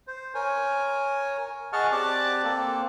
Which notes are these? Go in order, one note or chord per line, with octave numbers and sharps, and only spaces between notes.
C5
A#4 C#5 G#5
G#4 D#5 F#5 A5 C#6 F6
C4 G4 D5 A5 D6 F#6
A#3 C4 A4